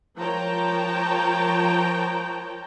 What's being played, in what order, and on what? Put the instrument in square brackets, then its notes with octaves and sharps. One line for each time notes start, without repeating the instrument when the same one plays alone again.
[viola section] F3 A#4 C#5 G5 A5 A#5